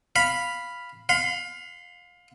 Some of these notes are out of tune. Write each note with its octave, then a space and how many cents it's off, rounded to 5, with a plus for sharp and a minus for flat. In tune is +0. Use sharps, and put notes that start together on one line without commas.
F5 +0 B5 +0
F5 +25 C6 -45